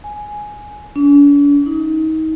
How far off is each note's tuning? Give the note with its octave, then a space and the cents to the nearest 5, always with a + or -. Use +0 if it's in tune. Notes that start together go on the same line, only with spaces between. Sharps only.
G#5 +5
D4 -45
D#4 +30